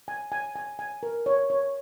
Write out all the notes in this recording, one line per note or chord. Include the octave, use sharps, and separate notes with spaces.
G#5
G#5
G#5
G#5
A#4
C#5
C#5